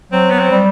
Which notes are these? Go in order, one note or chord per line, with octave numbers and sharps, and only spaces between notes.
F#3 C4
B3
C4
G3